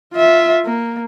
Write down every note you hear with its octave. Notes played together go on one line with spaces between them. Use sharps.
F4 E5
A#3